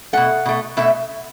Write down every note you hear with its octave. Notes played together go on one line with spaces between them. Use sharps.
B2 A3 F#5
B2 A3
B2 A3 E5